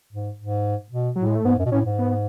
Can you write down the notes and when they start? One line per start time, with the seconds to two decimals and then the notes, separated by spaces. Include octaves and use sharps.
0.13 G#2
0.39 G#2
0.92 B2
1.15 A2 F#3
1.26 G#3
1.35 A3
1.45 G#2 B3
1.58 F#2
1.66 B2
1.71 A2 C#4
1.85 G#2
1.98 B3